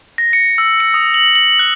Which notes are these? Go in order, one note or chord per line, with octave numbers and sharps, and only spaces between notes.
A#6
C#7
E6
C#7
D#6
F#7
F#7
F#6